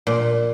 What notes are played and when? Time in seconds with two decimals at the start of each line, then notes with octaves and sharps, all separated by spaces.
0.07 A#2